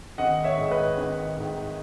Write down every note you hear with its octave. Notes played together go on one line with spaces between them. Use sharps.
G#1 D#5 F#5
C#5 E5
G#2 D#3
B4 D#5
G#1
G#2 D#3